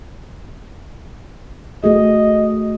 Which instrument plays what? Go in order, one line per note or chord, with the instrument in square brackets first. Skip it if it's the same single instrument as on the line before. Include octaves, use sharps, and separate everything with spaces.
[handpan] A3 F#4 G#4 [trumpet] D#5